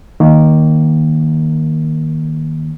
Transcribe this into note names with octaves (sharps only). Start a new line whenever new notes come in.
D#3 A#3